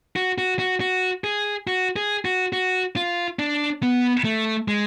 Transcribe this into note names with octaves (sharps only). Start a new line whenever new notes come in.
F#4
F#4
F#4
F#4
G#4
F#4
G#4
F#4
F#4
F4
D4
B3
A3
G#3